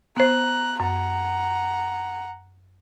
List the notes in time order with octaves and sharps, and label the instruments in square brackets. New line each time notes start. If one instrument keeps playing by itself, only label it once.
[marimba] B3 C5 [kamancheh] A#5 F#6
[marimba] F#2 [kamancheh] F#5 A#5